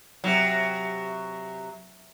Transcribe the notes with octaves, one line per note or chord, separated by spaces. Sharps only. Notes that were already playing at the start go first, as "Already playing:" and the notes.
C3 F#3